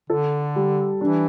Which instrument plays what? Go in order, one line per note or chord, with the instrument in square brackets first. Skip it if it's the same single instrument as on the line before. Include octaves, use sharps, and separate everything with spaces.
[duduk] D3 [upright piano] A4
[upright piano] G3
[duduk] E3 [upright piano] D4